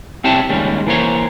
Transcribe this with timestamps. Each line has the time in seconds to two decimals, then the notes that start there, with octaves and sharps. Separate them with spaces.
0.24 C4 E4 G4 C#5 A5
0.49 D#2 G3 G#3 C#4
0.87 E3 A#3 C5 C#5